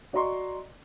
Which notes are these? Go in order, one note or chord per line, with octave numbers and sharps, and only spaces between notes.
F#4 D5 D#5 A#5 C6 C#6